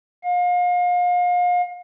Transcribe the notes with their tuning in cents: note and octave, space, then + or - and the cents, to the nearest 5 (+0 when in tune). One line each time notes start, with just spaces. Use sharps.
F5 +35